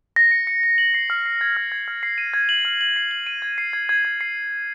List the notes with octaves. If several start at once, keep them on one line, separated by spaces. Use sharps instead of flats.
A#6
C#7
C#7
C#7
F#7
C7
F6
C7
G#6
F6
G#6
F6
C7
D#7
G#6
F#7
F6
F#7
C7
F#7
D#7
G#6
C7
G#6
G#6
G#6
C7